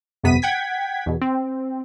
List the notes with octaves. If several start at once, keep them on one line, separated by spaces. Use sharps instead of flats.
G1 F2 C3 B3 B6 D#7
F#5 G5 G#6 B6
E2 B2
C4